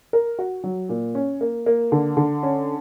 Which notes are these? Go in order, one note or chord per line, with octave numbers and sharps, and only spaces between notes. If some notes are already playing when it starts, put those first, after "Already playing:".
A#4
F#4
F#3
A#2
C#4
A#3
A#3
D3
D3
C#4